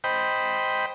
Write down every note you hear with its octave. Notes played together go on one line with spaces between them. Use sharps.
C5 D#5 G5 B5